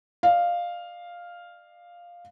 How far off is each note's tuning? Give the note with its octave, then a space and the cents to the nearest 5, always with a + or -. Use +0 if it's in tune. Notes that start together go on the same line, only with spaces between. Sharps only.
D5 +45 F5 +0